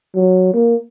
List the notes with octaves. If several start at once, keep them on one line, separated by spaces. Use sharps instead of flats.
F#3
A#3